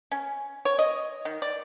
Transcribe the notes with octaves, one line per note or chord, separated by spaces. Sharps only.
C#4
C#5
D#5
D#3
D5